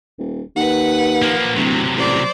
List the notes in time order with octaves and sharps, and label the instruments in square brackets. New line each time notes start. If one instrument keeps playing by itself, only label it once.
[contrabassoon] D#1
[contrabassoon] D#2 [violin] B4 F#5
[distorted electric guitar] F3 A#3
[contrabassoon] D1 [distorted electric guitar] C3 F#3
[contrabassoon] A1 [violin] C5 D5